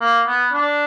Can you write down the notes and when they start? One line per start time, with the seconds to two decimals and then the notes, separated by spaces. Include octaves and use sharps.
0.01 A#3
0.27 B3
0.53 D4